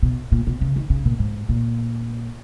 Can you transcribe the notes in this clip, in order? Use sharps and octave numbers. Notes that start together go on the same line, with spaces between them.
B2
A#2
B2
C#3
D#3
C#3
A#2
G#2
A#2